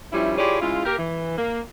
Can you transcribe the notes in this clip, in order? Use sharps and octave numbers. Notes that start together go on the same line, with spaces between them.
D#3 F3 G3 C#4 E4
E4 F4 G4 G#4 C#5 D5
C#3 G#3 E4 F4
A#3 G4 A#4
E3
A#3